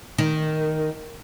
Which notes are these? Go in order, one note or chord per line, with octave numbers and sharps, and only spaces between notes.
D#3